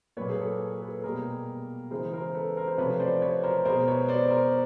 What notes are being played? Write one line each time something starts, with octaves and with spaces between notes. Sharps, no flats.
A#2 F#3 A#3 B4 C#5
G#4
A4
A4 B4
B2 G3 A#3 G#4 A#4
C#3 E3 G#3 A#4 C5
A#4 C5
A4 B4
A#4 C5
C5
C3 F3 A3 B4 C#5
C5 D5
B4 C#5
A#4 C5
B2 G#3 A#4 C5
B4 C#5
C5 D5
A#4 C5